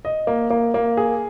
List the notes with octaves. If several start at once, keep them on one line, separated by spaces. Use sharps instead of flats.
D#5
A#3
A#3
A#3
G#4